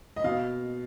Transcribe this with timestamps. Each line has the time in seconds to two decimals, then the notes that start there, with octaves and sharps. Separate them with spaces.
0.16 D#5
0.24 B2 F5